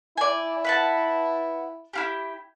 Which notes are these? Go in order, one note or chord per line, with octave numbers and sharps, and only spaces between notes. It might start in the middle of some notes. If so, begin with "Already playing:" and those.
E4 D5 G#5
B4 F#5 A5
E4 F4 G4